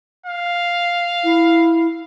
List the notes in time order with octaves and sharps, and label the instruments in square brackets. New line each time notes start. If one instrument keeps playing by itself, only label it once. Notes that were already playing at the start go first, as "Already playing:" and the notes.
[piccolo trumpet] F5
[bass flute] E4